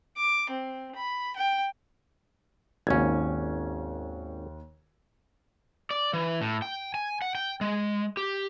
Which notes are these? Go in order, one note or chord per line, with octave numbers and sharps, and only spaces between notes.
D6
C4
B5
G5
G#1 D#2 C#4 G#6
D5
E3
A2
G5
G#5
F#5
G5
G#3
G4